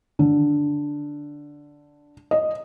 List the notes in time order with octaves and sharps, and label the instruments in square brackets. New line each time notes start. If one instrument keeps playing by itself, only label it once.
[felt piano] D3
D#5